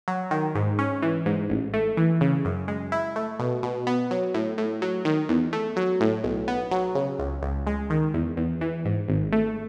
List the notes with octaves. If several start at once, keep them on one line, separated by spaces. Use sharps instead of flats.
F#3
D#3
G#2
C#4
E3
G#2
A1
A3
E3
C#3
F#2
G#3
E4
A3
B2
B2
B3
F#3
A2
A2
F#3
D#3
E2
A3
F#3
A2
B1
B3
F#3
C#3
C#2
C#2
G#3
D#3
E2
E2
E3
G#2
G#1
A3